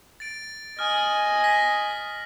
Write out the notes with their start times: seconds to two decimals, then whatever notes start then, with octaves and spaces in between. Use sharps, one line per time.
0.20 A6 D7
0.79 D#5 G#5 D#6 F6
1.44 A#6 B6